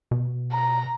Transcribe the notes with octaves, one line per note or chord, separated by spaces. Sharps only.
B2
A#5